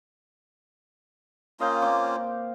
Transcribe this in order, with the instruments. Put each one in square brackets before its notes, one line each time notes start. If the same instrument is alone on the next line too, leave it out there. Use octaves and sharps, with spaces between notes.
[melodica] A#3 C#4 F4 [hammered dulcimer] D#5 F5 G5
[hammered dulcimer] A#2 C4 D6